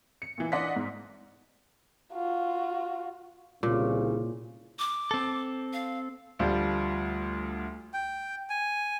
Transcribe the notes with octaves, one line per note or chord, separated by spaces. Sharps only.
C#7
A#2 E3
D4 D5 D#5 F#5 C6 B6
G#2
F4 F#4
C2 A#2 C#3
D6
C4 A4
F5
D2 F3 G3
G5
G#5